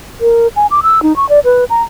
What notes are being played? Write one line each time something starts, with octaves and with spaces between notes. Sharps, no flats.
A#4
G#5
D6
E6
D#4
C#6
D5
B4
A#5